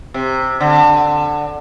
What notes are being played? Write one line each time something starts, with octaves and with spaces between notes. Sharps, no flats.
C3
D3